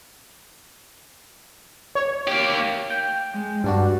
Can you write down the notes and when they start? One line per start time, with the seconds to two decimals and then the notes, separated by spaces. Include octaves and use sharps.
1.95 C#5
2.27 A#3 G4
2.90 G5
3.33 G#3
3.64 G2 G3 D4 F#4